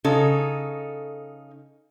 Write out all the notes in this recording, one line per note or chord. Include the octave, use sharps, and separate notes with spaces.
C#3 D#4 A4